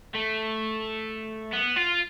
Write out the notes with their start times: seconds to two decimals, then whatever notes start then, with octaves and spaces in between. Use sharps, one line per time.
0.14 A3
1.53 B3
1.77 F4